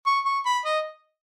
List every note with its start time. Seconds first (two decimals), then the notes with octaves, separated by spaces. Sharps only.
0.06 C#6
0.25 C#6
0.46 B5
0.65 D#5